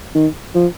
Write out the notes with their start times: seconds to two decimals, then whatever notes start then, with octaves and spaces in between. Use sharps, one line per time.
0.15 D#3
0.55 F3